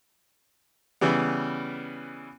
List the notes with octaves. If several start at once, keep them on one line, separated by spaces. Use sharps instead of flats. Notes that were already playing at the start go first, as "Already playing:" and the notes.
C#3 E3 G3 B3